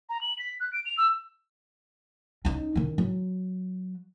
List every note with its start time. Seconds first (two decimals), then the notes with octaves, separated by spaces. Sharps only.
0.09 A#5
0.21 F#7
0.39 B6
0.60 F#6
0.73 D7
0.85 F7
0.97 E6
2.45 C#4 D#4
2.75 D#3 C#4
2.98 F#3